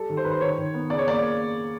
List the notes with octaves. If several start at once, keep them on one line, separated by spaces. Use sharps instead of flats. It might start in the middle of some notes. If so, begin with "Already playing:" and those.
Already playing: G3 A4
D#3
C5
D#3 B4
C5
D#3 C#5
D#3
B3
C#3 D5
C#5
A#3 D5